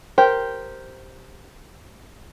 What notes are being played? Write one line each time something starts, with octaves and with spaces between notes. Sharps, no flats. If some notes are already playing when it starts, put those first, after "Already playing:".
G4 A#4 C5